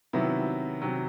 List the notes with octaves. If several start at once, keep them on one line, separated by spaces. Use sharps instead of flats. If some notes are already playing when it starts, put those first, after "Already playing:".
C3 D#3 F#3 B3 E4
C3 D#3 F#3